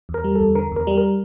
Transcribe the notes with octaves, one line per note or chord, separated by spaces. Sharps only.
E2
A#4
G3
E2 A4
D3 A#4
E2 A#4
G3
A#4